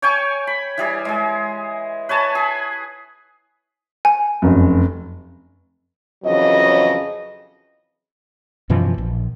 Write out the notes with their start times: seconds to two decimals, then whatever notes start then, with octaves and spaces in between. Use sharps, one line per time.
0.02 C#5 G5 G#5 C#6
0.47 B5
0.78 E3 G3 G#4
1.05 G#3 G#4
2.09 B4 C#5 G#5 A5
2.35 G#4
4.05 G#5
4.42 F1 F#2
6.24 F2 C#3 E3 F#3 D#5
8.70 F#2 B2 E3 F3
8.98 A#1